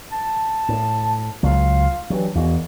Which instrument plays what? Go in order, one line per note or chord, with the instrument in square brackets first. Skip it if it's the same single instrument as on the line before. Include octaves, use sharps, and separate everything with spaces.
[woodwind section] A5
[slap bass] A2
[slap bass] C#2 F#3 [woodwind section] F4 F5
[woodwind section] G2 E3 [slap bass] F#3
[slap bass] E2 [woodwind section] G#3 A#3 F#4